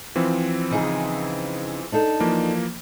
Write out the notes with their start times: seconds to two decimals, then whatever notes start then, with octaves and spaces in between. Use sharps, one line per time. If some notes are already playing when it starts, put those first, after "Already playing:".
0.16 E3 F3 C4
0.71 C#3 D#4 G#4
1.92 D4 D#4 A4
2.20 E3 F3 A#3